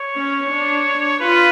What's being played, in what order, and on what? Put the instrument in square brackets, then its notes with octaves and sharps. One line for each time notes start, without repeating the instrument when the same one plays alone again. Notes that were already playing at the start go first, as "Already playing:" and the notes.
Already playing: [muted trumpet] C#5
[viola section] C#4
D4
[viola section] F4 [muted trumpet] B4